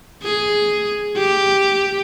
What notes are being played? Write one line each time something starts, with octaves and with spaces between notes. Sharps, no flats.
G#4
G4